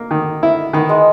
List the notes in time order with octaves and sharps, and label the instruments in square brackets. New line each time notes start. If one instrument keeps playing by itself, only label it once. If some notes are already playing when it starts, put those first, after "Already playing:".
Already playing: [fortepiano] A#3
D#3
E4
[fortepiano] D#3 [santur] B3
[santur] G#3